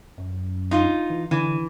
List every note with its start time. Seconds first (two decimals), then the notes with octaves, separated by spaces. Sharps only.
0.18 F#2
0.71 D#4 F4
1.10 E3
1.31 D3 E3